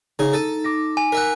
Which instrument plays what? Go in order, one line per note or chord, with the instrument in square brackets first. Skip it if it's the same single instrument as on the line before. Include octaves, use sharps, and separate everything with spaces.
[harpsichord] C#3 G#4 [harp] D#4
[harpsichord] A4 [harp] A6 D#7
[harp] D6 A#6
[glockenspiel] G#5
[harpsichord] A#4 E5 F#5 [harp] B6